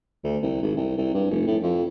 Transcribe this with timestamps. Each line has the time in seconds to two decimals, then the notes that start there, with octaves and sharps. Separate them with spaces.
0.24 D2
0.43 C2
0.62 G#1
0.77 C2
0.97 C2
1.14 G2
1.31 F1
1.47 A2
1.62 F2